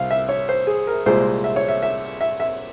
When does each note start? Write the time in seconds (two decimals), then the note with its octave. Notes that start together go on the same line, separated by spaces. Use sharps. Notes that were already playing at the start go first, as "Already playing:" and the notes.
Already playing: C2 F5
0.11 E5
0.29 C#5
0.49 C5
0.67 G#4
0.87 A#4
1.06 C2 A#2 G#3 C5
1.44 E5
1.56 C#5
1.68 E5
1.82 E5
2.21 E5
2.40 E5